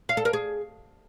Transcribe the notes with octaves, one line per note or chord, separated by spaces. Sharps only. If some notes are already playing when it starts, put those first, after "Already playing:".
F5
A4
A#4
G#4